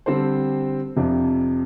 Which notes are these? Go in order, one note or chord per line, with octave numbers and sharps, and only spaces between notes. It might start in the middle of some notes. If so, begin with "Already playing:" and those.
D3 G3 C4 A4 C5
F2 C3 F3 D4